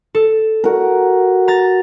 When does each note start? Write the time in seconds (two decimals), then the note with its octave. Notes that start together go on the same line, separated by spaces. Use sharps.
0.15 A4
0.64 F#4 A#4
1.48 A#5 A6